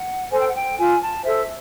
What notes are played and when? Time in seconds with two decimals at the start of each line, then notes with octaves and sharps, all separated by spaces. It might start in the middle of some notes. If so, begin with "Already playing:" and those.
Already playing: F#5
0.31 A4 C5 G#5
0.39 G5
0.47 F#5
0.55 G5
0.77 F4 G#5
1.01 A5
1.24 A4 C5 E5